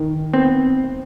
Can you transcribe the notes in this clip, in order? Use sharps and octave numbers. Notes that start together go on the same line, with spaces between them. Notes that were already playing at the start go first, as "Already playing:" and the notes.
Already playing: D#3
B3 C4